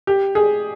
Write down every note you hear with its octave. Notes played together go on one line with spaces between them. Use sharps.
G4
G#4